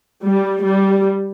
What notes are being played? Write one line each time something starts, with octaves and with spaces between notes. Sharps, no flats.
G3
G3